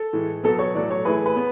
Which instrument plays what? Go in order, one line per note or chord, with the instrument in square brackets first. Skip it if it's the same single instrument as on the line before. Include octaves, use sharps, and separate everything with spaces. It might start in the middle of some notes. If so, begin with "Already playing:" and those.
Already playing: [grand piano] A4
[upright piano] A2 E3 G#3
[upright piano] B2 F#3 B3 [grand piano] A4
[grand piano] C#5
[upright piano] A2 F#3 A3 [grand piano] D5
[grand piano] C#5
[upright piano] E3 A3 E4 G#4 [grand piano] B4
[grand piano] B4
[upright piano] B3